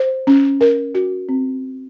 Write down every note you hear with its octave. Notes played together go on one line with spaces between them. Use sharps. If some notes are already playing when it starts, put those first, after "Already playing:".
Already playing: C5
C#4
A#4
F#4
C4